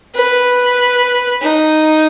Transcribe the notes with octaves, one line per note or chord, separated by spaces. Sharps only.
B4
D#4